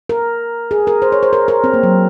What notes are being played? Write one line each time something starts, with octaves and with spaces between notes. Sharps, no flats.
A#4
G#4
A#4
C5
C#5
C5
A#4
A#4
C4
A#3
F#3